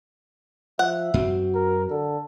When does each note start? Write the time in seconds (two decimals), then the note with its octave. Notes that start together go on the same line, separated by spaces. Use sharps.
0.79 F3 E5 F#5
1.14 F#2 B3 C4 F#4
1.55 A#4
1.90 D3 A4